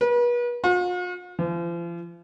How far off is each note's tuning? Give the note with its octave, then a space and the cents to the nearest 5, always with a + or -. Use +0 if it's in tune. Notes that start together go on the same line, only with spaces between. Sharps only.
B4 -40
F4 +45
F3 -40